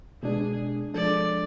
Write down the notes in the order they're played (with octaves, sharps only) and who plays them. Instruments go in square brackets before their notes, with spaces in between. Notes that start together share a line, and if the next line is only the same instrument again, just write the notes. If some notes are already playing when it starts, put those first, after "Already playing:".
[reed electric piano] B2 G#3 D4 [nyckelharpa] G#4
[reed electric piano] F3 G#3 D4 A4 [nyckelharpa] D5